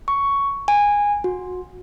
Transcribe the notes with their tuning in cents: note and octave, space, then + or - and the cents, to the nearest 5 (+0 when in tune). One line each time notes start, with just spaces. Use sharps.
C#6 +5
G#5 -15
F#4 -25